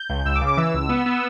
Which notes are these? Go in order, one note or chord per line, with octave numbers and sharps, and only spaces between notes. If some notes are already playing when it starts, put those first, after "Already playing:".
Already playing: G6
C#2
C#2 E6
D6
C#3
D6
E3 E6
C#2
B3
B3